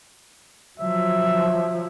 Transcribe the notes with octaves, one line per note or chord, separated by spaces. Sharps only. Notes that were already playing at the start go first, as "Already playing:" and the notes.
F3 F#3 E5